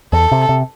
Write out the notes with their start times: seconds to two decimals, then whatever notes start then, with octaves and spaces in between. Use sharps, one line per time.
0.13 E2 A4
0.32 C3
0.49 C3